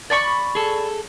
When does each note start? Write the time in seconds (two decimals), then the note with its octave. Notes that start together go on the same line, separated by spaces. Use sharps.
0.10 D5 B5 C#6
0.55 G#4 A4